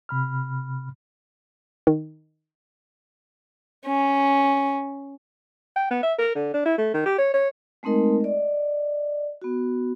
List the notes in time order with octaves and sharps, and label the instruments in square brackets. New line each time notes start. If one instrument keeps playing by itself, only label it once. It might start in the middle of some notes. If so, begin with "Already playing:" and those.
[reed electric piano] C3 B5 F6
[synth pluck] D#3
[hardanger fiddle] C#4
[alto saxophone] G5
B3
E5
A#4
D3
D4
E4
A3
D#3
G4
C#5
C#5
[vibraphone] G#3 A3 C4 D#4 A#4 D#5
D5 D#5
B3 F#4